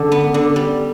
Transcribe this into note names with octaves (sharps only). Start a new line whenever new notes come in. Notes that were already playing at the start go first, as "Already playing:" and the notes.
Already playing: D3
B3
D3
G3